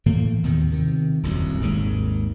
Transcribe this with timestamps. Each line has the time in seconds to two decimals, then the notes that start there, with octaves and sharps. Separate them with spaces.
0.06 A2 E3 A3 A#3
0.43 D#2 B2 D#3
0.72 C3 D#3
1.23 D#1 C2 F#2
1.61 G#1 D#2 D#3 G#3